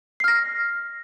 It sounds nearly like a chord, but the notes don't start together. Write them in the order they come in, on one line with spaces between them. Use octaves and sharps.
C7 F6 A#6